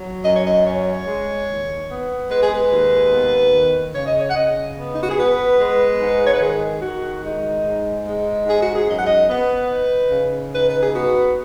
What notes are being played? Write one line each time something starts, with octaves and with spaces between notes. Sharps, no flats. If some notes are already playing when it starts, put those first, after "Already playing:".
Already playing: F#3
F#2 D#5
C#5
D#5
C#4 C#5
G#3
D#2
B3
G#3 B4
G#4
B4
D#2
B3
D#3
C#3 C#5
D#5
C#5
F#5
C#3 D#5
B3
D#4
F#4
G#4
B3 B4
G#3
G#2
C#5
B4
D#3 G#4
D#3 F#4
G#3 D#4
G#2
G#3
G#2 G#4
F#4
G#4
F#2 D#5
F#5
D#5
B3 B4
D#4
C#3
D#4 B4
B4
G#4
B3 F#4